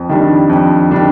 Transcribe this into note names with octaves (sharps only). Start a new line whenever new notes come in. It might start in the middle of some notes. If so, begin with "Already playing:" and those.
Already playing: F2
D#3 G3 D4
F2
D#3 G3 D4